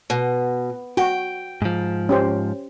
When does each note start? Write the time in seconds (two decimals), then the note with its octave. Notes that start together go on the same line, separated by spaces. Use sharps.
0.10 B2
0.97 F#4 G5
1.62 G#2 F3
2.09 C#4 G4 C5